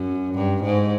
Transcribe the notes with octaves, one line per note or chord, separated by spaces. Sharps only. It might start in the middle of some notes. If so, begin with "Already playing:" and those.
Already playing: F#2
G2
G#2